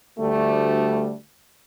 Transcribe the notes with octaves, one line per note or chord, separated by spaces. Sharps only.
D2 G3 A3